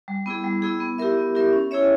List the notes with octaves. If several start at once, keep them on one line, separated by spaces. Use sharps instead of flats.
G3
B3 E4 G#4
G3
B3 E4 G#4
B3
E4 G4 A#4 E5
B3
E4 G4 A#4 E5
C#4
E4 G#4 C#5 E5